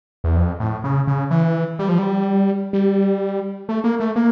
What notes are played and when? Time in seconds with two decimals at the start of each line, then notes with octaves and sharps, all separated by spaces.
0.24 E2
0.36 F2
0.60 A2
0.84 C#3
1.07 C#3
1.31 E3
1.79 G3
1.89 F3
1.99 G3
2.73 G3
3.69 A3
3.84 A#3
4.00 A3
4.16 A#3